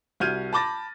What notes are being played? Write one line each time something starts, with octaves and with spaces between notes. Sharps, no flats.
C2 F#4 F6 G6 G#6 D#7
A5 B5 D6 A6 A#6